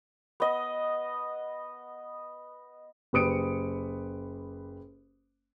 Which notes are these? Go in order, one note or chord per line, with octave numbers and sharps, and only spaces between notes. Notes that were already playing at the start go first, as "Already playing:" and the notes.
B3 D#5
F#1 G4 B4 D#6 C#7 D7